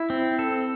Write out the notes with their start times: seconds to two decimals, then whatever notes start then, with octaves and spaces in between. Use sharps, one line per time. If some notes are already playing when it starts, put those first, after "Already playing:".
Already playing: E4
0.10 C4
0.39 A4